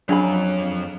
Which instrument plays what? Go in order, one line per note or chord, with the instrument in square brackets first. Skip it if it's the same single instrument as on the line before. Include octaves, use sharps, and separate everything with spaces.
[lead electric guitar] F2 F5 [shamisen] C#3 G#4 B5 [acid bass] F#3 [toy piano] D4